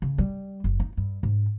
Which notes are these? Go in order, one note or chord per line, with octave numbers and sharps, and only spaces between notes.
C#3
G3
F#1
D#4
G2
G#2